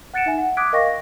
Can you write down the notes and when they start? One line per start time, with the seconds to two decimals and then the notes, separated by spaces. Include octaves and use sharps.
0.14 F#5 F#6 A6 C#7 D7 E7
0.26 D#4 E5 G#5
0.38 F#5
0.57 D6 D#6 F#6 G#6 B6 D7
0.73 A#4 D#5 F5 G5 C#6 A#6
0.86 A#6